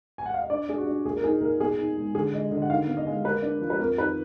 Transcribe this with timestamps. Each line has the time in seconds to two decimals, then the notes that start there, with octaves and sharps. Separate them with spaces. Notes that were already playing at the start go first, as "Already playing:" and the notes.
0.18 G#5
0.26 F#5
0.34 F5
0.42 D#5
0.50 D4 D5
0.69 D4 G#4
0.78 F#4
0.87 D4
1.05 A#2 G#4
1.17 A#4
1.23 D#4 G#4
1.41 A#2 A#4
1.60 B2 G#4
1.78 D#4
1.97 G#3
2.15 D3 G#4
2.33 G#3 D#5
2.51 D3 D#5
2.62 F#5
2.69 D#3 F5
2.87 B3
2.97 D#5
3.07 G#3
3.24 A#3 B4
3.42 D4
3.61 F3
3.70 B4
3.79 F2 A#4
3.97 D#3 B4